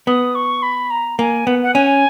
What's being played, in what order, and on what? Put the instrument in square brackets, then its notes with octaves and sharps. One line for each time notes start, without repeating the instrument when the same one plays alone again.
[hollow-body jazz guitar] B3 [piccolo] D#6
[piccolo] C#6
B5
A#5
[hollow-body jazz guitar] A#3 [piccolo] G#5
[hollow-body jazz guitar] B3 [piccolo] F#5
[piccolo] F#5
[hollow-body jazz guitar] C#4 [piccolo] G#5